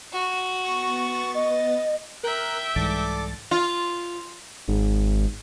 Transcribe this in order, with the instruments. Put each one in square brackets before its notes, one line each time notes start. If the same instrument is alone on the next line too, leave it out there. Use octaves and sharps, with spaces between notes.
[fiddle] F#4
[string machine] B3 A6 [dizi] C#6
[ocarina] D#5
[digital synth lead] A#4 [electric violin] E5 G5 [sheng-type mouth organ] F#6
[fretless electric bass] C2 G#2 E3 [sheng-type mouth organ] A4 D5 D6 [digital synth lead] A6
[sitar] F4
[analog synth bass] G#1